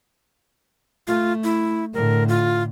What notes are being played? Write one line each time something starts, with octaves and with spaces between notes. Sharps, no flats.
A3 F4
E4
A2 D3 A#4
F4